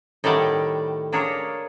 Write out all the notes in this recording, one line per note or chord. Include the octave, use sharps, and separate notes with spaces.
A2 D#3 G3 D5 F#5
A#3 D4 G#4 A#4 C#5